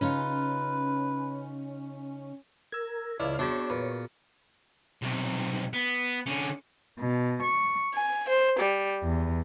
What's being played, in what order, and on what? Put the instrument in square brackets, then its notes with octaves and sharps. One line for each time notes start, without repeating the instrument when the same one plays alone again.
[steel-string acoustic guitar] C#3 D#4 F4 [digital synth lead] C#4 [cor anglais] B4
[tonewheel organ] A#4 [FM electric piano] E6 G#6
[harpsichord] C#2 E4 [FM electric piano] D5 [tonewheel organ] F5
[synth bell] B3 F#4 G#4 [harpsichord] C4 D4 [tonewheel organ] C#5
[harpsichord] A#2 [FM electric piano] B4
[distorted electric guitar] B1 C3
B3
D3 C#4
[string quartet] B2
C#6
G#5
C5
G3
E2